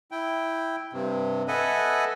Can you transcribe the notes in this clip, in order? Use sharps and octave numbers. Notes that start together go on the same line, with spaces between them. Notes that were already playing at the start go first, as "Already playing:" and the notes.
E4 G5
G2 C3
A4 B4 D#5 E5 F#5 G#5